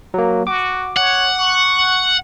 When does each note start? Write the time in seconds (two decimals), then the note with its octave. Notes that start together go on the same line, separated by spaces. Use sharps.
0.14 F#3 A#3
0.47 F#4 D6
0.97 C#5 F#5
1.37 C#6